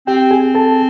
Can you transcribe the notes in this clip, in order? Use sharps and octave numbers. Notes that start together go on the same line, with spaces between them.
C4 G4 G5
G#4 G#5
A4 A5